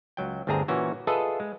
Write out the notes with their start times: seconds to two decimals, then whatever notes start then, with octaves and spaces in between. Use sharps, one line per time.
0.17 C#2 F#3 G5
0.47 G1 D2 C4 D4 G#4 A#5
0.68 A#2 E3 C#4 F#4
1.07 F4 G#4 A4 B4 D#5 E5
1.40 G#3